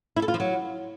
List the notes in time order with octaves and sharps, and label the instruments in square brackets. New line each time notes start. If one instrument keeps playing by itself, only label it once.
[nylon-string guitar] E4
A4
F4
F3
F#3